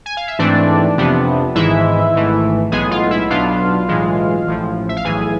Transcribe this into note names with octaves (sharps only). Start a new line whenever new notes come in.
G#5
F5
E5
G#2 E3 A3 C4 D4 D5
F2 C3 F3 B3 D4
G#1 G#2 E3 G#3 E4 E5
G#1 G#2 E3 A3
B1 A2 G#3 B3 G#4 G#5
F4 F5
E4 E5
B1 B2 B3 D4 F4 F5
B1 A2 E3 G#3
A1 A2 F3
E5
F5
B1 A2 E3 G#4 G#5